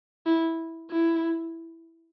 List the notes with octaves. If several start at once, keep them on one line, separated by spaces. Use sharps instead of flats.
E4
E4